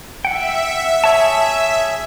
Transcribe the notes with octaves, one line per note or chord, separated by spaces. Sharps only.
E5 F#5 G5
G#4 C#5 A5